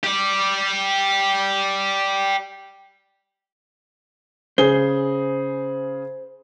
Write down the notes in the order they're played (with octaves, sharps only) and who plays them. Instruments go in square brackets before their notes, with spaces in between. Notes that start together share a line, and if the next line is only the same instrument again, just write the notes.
[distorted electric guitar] G4 D5
[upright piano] C#3 G#4 G7 [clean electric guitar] C5